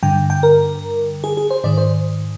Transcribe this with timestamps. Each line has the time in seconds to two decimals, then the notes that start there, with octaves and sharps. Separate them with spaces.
0.03 G2 D3 G5
0.30 G5
0.43 A#4
1.24 G#4
1.37 G#4
1.50 C5
1.64 G#2 D#3 D5
1.78 C5